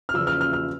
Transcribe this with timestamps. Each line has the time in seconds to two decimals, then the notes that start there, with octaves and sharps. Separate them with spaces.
0.09 F6
0.14 E2 C#3 F3 E6
0.27 F6
0.41 F6
0.53 F6